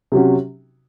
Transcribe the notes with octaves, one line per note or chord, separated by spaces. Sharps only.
C3 F#3 C#4 F#4